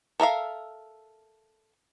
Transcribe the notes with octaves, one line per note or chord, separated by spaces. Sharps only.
A4 A#4 E5 F5